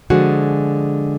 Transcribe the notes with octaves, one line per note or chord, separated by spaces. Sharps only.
D3 F3 G#3 F#4 G#4